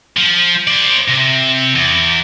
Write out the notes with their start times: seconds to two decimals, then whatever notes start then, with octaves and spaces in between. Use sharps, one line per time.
0.17 F3
0.67 C5 D5
1.09 C3
1.75 E2